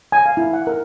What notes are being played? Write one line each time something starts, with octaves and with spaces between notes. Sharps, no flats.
G#5
F5
E4
F#5
A#4